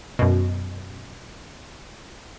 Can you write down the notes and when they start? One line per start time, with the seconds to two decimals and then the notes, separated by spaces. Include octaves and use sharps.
0.19 F#2 B2